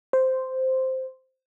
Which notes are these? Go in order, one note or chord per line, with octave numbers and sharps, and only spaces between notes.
C5